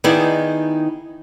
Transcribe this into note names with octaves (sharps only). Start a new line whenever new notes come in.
D#3 B3 D#4 E4 G#4 D5